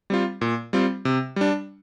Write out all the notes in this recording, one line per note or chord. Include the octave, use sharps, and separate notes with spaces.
G3 C4 F4
A#2
G3 C4 F4
C3
G3 D4